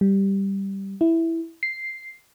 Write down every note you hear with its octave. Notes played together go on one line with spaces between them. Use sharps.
G3
E4
C7